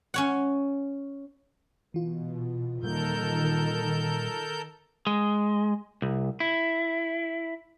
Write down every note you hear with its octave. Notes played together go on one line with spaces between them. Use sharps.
C#4 C#5 F#5
B2 E3 F4
A#2 D#3 G3 A#3 A4 A#4 G6
G#3
C2
E4